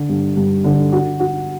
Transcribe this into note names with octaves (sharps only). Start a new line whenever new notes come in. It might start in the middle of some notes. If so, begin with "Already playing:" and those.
Already playing: D3
G2
G2
D3
F#4
F#4